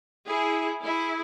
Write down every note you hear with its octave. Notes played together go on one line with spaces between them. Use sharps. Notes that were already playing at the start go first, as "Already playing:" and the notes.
E4 G#4
E4 G#4